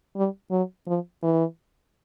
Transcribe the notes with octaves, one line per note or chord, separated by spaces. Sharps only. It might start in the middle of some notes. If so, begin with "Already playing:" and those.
G3
F#3
F3
E3